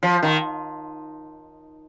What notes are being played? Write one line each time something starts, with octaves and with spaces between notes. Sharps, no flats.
F3
D#3